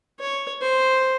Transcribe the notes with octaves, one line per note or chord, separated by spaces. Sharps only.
C#5
C5